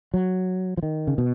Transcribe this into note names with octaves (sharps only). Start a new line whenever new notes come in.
F#3
F3
D#3
C#3
B2